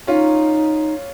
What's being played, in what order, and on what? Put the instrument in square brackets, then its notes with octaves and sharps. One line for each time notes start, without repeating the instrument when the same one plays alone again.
[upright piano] C#4 F4 [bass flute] D#4